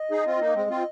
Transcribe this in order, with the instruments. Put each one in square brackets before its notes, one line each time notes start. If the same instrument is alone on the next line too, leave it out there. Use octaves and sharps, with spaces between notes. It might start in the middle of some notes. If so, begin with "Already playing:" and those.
Already playing: [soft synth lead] D#5
[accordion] D#4 G#4
C4 F4
A#3 D#4
G#3 C4
C4 F4